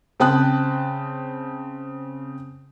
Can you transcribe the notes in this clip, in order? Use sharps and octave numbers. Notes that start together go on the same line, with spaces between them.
C#3 C4 G5 A5 D#6 F#6